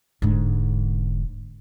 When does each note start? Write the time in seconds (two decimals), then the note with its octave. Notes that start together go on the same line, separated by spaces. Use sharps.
0.22 E1 G#2 D3